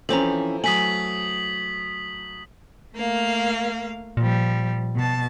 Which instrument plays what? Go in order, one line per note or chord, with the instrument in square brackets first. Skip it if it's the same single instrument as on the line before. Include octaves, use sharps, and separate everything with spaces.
[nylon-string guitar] E3 C4 C#4 [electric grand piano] F3 [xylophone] A4 C5 A#5
[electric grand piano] F#3 A3 [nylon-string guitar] G#5 [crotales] D#6 B6 F#7
[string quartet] A3 A#3 F5
[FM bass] A#2 [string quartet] F3 G3
[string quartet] B2 A5